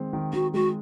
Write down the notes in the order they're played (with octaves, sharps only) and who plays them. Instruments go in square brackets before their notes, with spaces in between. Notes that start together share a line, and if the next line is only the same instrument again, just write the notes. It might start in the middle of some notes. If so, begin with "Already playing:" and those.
Already playing: [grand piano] D#3 G#3 C4
D#3
[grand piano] D#3 [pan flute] F#4
[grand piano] G#3 [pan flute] F#4